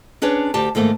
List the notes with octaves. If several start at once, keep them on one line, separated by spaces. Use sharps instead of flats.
C#4 D4 G#4 B4 C#5
D2 G4 A5
G#2 D#3 A3 A#3